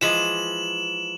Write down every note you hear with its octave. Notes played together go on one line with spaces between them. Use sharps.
E3 F3 G#3 E7 F#7